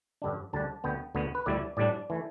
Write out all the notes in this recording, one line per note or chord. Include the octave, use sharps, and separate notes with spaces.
G2 D3 G3 D4
D2 D3 G3 D4 A5
D2 D3 B3 G5
D2 D3 B3
B4
D2 D3 G3 E4 D5
A2 G3 D4 D5
E3 A3